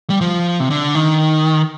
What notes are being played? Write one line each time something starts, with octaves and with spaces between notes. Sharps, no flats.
G3
F3
C3
D3
D#3